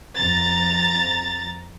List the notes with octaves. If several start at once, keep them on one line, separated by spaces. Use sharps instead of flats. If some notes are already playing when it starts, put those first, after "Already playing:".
F2 A#5 A6